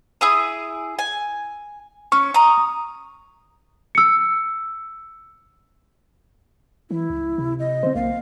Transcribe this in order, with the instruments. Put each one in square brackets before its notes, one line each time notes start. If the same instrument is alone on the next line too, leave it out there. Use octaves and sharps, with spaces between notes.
[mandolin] E4 G#4 D#6
G#5
[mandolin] C#4 [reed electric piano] C#6
[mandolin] A#5 D#6
[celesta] E6 C#7
[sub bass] E3 [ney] E4
[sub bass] C#2
C3
[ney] D#5
[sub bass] D3 [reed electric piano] C4 C5
[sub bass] B1 [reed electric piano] A#3 [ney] F5